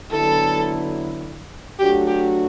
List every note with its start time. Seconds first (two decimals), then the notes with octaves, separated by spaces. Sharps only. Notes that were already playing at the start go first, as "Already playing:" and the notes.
0.10 D3 F#3 B3 E4 A4
1.79 F#3 A3 D4 F#4 G4
2.07 G4